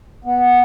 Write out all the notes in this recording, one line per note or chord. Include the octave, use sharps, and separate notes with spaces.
B3